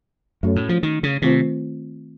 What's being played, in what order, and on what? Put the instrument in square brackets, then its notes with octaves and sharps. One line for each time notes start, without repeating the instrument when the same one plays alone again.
[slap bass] F#2 [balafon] A3 C#4 F#4 A4 C#5
[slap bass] A2
F3
D#3
C#3
[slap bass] C3 [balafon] D#3 A3 C4 F4 C5